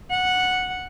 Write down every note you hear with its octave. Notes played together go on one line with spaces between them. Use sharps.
F#5